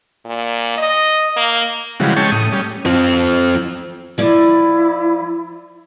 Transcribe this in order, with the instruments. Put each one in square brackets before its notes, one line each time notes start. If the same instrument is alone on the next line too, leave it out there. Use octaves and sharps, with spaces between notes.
[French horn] A#2
D#5
A#3
[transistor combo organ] C#3 E3 F3 G3 G#3 F#4
G#3 C#4 G5 A5 C#6
A2 D#6
G3 C#4
[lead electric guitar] F3 C4
[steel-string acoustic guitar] F3 D5 [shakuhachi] E4